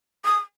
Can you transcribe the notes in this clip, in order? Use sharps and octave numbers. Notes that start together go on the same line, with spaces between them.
D#6